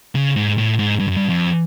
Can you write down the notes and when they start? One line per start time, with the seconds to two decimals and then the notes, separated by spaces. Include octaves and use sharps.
0.15 C#3
0.36 G#2
0.58 A2
0.79 G#2
0.99 G2
1.08 F#2
1.17 G2
1.29 F2